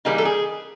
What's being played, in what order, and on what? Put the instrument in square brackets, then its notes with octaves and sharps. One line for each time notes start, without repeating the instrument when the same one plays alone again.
[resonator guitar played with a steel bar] E3 G3 A#3 D#4 G#4
A4
G#4